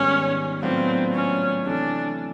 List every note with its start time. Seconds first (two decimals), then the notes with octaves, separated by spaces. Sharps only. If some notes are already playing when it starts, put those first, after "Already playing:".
Already playing: G#2 D#3 G3 B3 C#4
0.62 A2 F#3 B3 C4 D4 F4
1.14 C#4
1.66 C3 E3 A3 D4